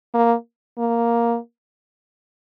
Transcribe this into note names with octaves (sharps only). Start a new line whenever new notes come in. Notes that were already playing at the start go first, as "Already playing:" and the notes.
A#3
A#3